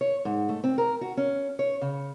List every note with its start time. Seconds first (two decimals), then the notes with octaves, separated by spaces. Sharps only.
0.01 C#5
0.25 G#2
0.49 A3
0.64 C4
0.78 A#4
1.01 F#4
1.17 C#4
1.59 C#5
1.81 C#3